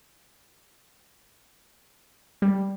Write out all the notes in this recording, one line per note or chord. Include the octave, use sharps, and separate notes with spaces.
G3